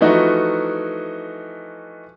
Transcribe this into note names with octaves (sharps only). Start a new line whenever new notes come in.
E3 F3 A3 D#4 F#4